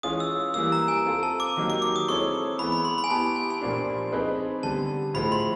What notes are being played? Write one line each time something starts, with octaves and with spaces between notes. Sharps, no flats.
E3 G#3 C#4 F4 D#6
E6
E3 G3 A#3 E6
A#5
G#5
C4 F4 A4
A5
D6
D#3 F#3 A#3 D#4 G4
D6
D6
D#6
G#3 C4 E4 A4 C#5 C#6
E3 G#3 B3 B5
B5
C6
B5
G#5
B3 E4 G4 A5
G#5
G#5
A#2 F3 A#3 D4 G4
C4 D#4 G#4 B4
D3 G3 B3 A5
A2 F3 G#3 B5
C6